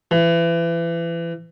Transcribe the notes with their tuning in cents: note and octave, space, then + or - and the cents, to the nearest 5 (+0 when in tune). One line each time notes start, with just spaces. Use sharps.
E3 +30